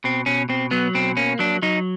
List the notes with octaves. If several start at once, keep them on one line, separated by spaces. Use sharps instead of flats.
B2 C4
B2 C#4
B2 C4
F#3 B3
B2 C4
A#3 C#4
F#3 D4
F#3 D#4